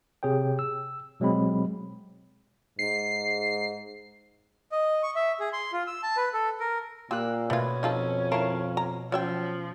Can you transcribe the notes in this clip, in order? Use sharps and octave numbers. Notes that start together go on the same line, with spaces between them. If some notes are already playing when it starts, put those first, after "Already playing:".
C3 G#4 C#5 G5
E6
B2 F#3 G#3 C4 B5
G#2 C7
D#5
C#6
E5
G#4
C6
F4
E6
A5
B4
A4
A#4
A#2 A#3 F4 G4 E6 F#6
B2 A3 C#4 F4 G#6
F2 D#4 F4 A4
E4 A#4 F5 A5 C#6
A#5
F3 F#3 C#4 E5 G5